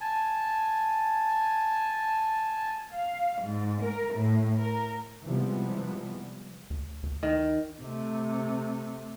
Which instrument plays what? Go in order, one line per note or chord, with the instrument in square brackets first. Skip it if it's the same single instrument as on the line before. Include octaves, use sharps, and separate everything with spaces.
[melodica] G#5 A5
[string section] F5
G#2
A#4
A2
A#4
[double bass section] C3 E3 F3 G3 G#3 B3
[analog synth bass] D2
D2
[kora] D#3
[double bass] C3 A3